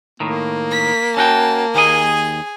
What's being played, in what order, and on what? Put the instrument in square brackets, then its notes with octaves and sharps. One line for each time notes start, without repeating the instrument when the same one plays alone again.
[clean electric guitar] A2 D#3 [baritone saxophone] A#3
[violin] B6
[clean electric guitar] C#4 F#4 G5 [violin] A5
[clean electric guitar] D#2 D#5 [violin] G#4 G#5